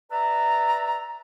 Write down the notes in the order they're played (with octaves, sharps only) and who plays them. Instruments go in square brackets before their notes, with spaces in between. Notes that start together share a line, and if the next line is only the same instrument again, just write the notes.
[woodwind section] B4 D5 E5 A#5